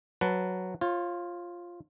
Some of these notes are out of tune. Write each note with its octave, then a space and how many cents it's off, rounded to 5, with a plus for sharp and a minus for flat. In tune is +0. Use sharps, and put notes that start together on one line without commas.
F#3 +0 B4 +0 A5 +0
F4 +0 C#5 -40